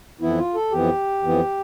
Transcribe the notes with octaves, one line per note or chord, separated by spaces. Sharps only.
F2 E3 B3 E4
F4
A4
F2 E3 B3 G4
F2 E3 B3